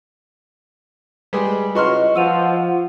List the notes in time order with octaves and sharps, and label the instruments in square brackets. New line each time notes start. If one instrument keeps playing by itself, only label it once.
[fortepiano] G3 G#3 [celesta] B4
[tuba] C#2 [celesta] E4 B4 C#6 [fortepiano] F#4 C6 F6 [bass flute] D#5
[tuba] F3 [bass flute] F#5 [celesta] E6 D#7 F7